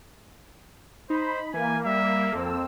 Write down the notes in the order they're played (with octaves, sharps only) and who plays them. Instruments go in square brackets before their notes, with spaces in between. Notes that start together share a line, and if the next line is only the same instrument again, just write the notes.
[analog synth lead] D#4 [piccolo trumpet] C5 [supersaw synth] B5
[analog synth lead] E3 [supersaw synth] A#3 [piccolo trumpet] G#5
[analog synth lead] G3 [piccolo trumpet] E5
[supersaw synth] F2 C4 E6 [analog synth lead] A4